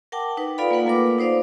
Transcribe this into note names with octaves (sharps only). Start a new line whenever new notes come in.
A#4 F#5 G5 A5 D6
D#4 B4
F4 A4 D5 F5 G5 B5
A#3 F4 B4 F#5
A3 A#3 F4 A4 A#4 D6
D#4 C5 D5 F5